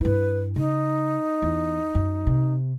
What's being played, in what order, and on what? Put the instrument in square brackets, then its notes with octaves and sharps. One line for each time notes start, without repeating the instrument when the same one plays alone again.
[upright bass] G2 E4 [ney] B4
[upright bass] C#3 [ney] D#4
[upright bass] E2
F#2
C3